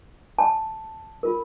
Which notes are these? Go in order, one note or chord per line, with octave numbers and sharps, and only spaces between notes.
A5
F4 A#4